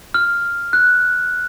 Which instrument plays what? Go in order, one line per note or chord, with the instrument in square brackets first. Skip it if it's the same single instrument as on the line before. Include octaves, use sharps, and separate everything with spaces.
[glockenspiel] F6
F#6